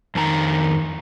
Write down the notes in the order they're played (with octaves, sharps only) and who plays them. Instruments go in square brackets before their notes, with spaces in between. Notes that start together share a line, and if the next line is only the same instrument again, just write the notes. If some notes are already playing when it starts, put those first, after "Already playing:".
[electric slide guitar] F2 D#3 A5 A#5